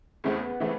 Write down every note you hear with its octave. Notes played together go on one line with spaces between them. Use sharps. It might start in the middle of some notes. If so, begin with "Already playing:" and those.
E2 C#3 E3 A3 B3 C4
C#3 E3 A3 C4